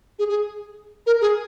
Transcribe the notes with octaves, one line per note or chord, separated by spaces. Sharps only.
G#4
G#4
A#4
G#4